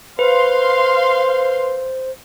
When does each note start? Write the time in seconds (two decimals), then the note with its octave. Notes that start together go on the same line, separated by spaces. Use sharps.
0.19 B4 C5 F5 C6